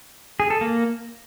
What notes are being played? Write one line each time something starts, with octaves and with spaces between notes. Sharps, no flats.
G#4
A4
A#3